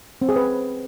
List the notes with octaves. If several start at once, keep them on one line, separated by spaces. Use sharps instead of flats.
C4
G#4
B4